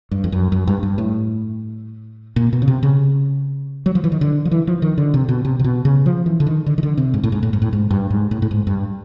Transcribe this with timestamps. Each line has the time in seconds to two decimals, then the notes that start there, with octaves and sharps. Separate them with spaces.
0.11 G2
0.24 F2
0.32 F#2
0.52 F#2
0.67 G2
0.83 G2
0.98 A2
2.36 A#2
2.53 B2
2.62 C#3
2.68 C3
2.83 C#3
3.86 F#3
3.95 F3
4.04 E3
4.12 D#3
4.21 D3
4.45 F3
4.51 E3
4.67 F3
4.82 D#3
4.98 D3
5.14 C3
5.29 B2
5.45 C3
5.59 C3
5.64 B2
5.85 C#3
6.06 F3
6.26 E3
6.40 D3
6.47 D#3
6.66 D3
6.78 D#3
6.83 D3
6.97 C3
7.14 G#2
7.24 A2
7.32 G#2
7.43 A2
7.53 G#2
7.62 A2
7.73 G#2
7.91 G2
8.10 G#2
8.31 A2
8.42 A2
8.51 G#2
8.67 G2